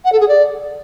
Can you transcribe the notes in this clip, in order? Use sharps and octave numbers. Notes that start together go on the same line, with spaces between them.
F#5
A4
G#4
D5